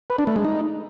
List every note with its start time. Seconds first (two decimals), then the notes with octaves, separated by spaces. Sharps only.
0.10 B4
0.18 D4
0.27 A3
0.36 G#3
0.45 D#4